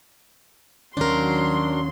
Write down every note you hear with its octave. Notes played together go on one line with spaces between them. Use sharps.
D#2 D#3 F#3 C#4 D4 A#4 C6